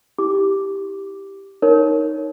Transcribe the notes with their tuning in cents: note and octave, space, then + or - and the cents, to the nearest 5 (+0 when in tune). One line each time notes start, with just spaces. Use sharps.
E4 -30 G4 +0 D6 +0
D#4 +0 A#4 +0 C#5 +0